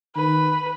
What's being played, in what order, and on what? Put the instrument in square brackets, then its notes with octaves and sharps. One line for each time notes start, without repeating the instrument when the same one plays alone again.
[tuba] D#3 [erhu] B4